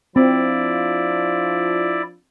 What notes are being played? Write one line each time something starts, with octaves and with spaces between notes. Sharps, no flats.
F3 C4 D4 E4 F4 D5